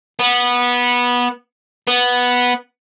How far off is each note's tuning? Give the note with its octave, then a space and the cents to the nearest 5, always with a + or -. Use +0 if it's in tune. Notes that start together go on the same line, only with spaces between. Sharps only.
B3 -15
B3 -5